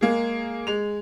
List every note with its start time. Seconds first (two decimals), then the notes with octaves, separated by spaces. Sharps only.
0.01 G#3 A#3 G#4
0.67 G#3 F7